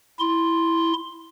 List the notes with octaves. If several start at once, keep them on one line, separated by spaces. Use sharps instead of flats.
E4 C6